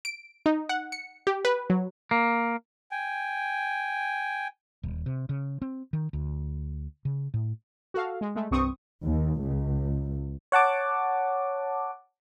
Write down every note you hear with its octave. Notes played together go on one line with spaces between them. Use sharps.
D7
D#4
F#5
C#7
G4
B4
F#3
A#3
G5 G#5
D#1
C3
C#3
C4
D#3
D2
C#3
A2
F#4 A4 F5
G#3
G#3 A3
C2 G2 C4 C#6 D#6
D#2
C#2
C#5 F#5 A5 D6